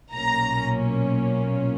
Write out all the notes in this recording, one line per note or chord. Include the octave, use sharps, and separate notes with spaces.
B1 A#2 A#3 C#4 A#5